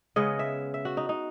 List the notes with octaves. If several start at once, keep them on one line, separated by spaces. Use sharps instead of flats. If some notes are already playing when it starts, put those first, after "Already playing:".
C#3 G#3 B3 D#5
E5
E5
F#4
D#4
D#4